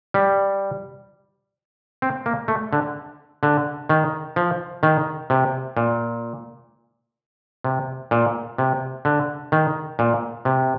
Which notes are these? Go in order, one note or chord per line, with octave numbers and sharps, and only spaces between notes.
G3
C4
A#3
A3
D3
D3
D#3
F3
D#3
C3
A#2
C3
A#2
C3
D3
D#3
A#2
C3